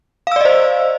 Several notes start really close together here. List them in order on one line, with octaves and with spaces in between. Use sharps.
F5 E6 D5 D#5 C5